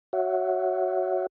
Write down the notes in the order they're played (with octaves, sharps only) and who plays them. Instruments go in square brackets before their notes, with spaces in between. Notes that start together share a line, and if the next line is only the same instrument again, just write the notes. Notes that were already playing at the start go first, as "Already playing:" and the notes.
[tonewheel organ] F#4 C#5 E5 F#5